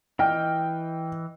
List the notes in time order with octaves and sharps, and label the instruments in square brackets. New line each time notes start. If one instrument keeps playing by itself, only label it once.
[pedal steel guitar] E3 D#5 F6 [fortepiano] G5